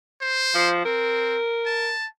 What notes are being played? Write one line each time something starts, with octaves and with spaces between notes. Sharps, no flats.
C5
F3
C4 A#4
A5